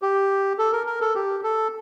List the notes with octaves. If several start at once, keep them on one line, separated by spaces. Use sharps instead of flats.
G4
A4
A#4
A#4
A4
G4
A4